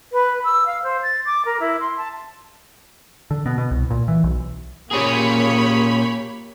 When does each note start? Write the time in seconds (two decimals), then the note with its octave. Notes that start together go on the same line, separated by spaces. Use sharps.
0.12 B4
0.44 E6
0.66 F5
0.83 C5
1.03 A6
1.25 D6
1.45 A#4
1.60 E4
1.80 C6
1.97 A5
3.31 D3
3.46 B2
3.58 B2
3.71 C2
3.90 A#2
4.08 E3
4.24 B1
4.91 A#2 A#3 C#4 G4 G#4 C#5 B5